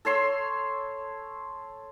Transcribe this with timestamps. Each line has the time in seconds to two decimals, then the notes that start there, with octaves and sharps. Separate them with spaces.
0.05 A4 C#5 C6 E6